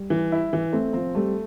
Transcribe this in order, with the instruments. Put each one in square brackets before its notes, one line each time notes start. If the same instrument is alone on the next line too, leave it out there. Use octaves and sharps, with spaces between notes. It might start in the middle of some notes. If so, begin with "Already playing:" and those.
Already playing: [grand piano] G3
[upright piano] E3
E4
E3
[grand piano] A3 [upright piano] C4
[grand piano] F3 [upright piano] C4
[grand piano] G3 [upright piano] A3